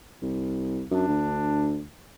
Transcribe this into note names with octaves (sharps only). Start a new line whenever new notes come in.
C2
F#2 D4
D2